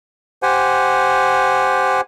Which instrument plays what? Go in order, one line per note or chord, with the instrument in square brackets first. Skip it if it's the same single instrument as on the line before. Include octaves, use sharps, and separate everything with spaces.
[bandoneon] G4 C5 F#5 G#5